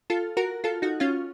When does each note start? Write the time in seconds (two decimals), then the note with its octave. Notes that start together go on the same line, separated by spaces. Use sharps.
0.10 F4 A4
0.37 F#4 A#4
0.64 F4 A4
0.82 D#4 F#4
1.00 C#4 F4